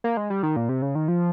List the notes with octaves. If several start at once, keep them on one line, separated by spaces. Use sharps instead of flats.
A#3
G#3
G3
D#3
A#2
C3
C#3
D#3
F3